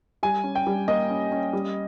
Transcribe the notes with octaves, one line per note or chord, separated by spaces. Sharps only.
G3 G#5
C#4
G5
G3
A#3 D#5
C#4
C#4
G3